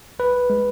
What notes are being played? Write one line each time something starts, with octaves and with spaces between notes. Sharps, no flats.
C2 B4
G#3